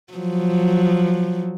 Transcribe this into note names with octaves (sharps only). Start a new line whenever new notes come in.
F3 F#3